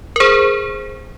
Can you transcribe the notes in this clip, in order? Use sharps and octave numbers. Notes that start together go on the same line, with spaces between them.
A#4
G#4 C5